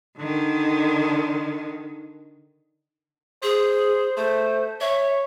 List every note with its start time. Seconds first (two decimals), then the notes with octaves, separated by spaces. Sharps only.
0.18 D3 D#3
3.43 G#4 C5
4.17 A3 C5
4.81 C#5 E5